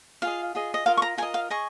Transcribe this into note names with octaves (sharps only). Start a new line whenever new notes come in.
F4 G#4 D#5 F5
F4 G#4 D#5
D#5
F4 A#4 D#5 F5
C#6
A#5
F4 A#4 D#5 G#5
F5
G#4 D#5 C#6